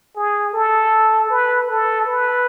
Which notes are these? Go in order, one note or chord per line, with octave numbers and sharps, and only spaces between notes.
G#4
A4
B4
A4
B4